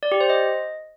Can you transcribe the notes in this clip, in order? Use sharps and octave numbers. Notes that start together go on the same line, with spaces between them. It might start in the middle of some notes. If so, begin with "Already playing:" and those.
D5
G4
C5
D#5